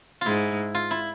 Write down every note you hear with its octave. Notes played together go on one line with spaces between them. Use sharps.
G#2 E4 F4
F4
E4